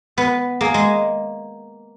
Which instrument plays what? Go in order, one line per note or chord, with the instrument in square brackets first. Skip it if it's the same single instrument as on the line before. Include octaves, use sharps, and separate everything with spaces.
[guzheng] B3 [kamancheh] B4
[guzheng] A#3 [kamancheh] G#4
[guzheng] G#3